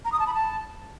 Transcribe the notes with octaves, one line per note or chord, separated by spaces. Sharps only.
A#5
D#6
A5
B5
A5